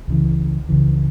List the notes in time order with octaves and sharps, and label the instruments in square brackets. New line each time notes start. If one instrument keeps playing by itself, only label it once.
[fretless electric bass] C#2 C#3 E3
C#2 C#3 E3